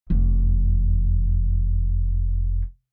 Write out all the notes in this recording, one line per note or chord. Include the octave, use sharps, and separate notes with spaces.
F1 E2